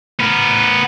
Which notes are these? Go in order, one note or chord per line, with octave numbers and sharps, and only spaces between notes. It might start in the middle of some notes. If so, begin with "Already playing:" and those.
B3 A#4